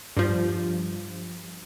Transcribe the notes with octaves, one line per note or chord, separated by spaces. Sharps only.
G2 F3